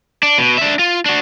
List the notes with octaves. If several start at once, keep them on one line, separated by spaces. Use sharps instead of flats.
D4
B2
D4 E5
F4
D4 F#4